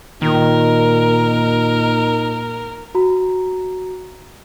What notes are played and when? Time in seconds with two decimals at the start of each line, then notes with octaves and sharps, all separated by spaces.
0.22 A#2 D#3 D#4 A#4
2.95 F#4 A#5